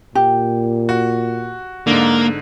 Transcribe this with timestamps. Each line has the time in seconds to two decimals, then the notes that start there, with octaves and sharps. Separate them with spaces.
0.15 A#2 G4
0.89 F#4
1.87 G#2 D3 A#3